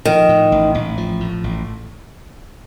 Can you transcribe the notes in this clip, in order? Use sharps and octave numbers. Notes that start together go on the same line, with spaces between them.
D#3 F3
A2
A1
A1
F3
A2
A1